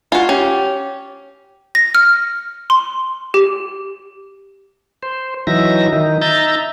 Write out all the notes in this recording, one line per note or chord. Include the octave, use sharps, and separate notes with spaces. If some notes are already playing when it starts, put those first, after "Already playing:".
F4 F#4 G#5
C#4 G4
A#6
F6
C6
G4
C5
E3 F#3 D#4 E5 A#6
D#3 D#4
D#4 E5 A#5 G6 A6